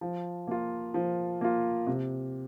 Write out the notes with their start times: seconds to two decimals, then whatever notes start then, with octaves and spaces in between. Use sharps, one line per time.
0.01 F3
0.47 A#3 F4
0.94 F3
1.41 A#3 F4
1.87 C3